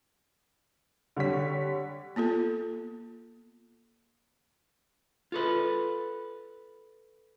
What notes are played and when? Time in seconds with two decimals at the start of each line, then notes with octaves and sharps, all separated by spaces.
1.17 D3 G3 C#5 B6
2.16 A#3 B3 F4 A4
5.32 F4 A4 B4